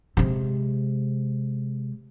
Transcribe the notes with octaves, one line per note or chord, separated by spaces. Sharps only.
C3 G#3